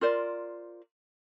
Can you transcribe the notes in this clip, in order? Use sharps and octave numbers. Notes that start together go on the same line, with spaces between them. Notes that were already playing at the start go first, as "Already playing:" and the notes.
F4 A#4 C5 D5